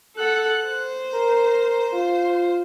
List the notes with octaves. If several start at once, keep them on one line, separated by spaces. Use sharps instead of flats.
A4 F#5 F#6
C5
A#4
F4